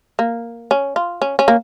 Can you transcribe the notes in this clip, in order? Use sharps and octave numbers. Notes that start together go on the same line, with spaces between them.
A#3
C#4
F4
C#4
C#4
A#3